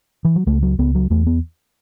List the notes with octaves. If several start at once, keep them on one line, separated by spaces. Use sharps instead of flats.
E3
F#3
C#2 A3
F#3
C#2 B3
F#3
E2 A3
B3